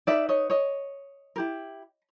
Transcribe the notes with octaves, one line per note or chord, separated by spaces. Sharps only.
D#4 F#4 B4 D5 E5
C#5 D#5
C#5 D#5
E4 G4 A#4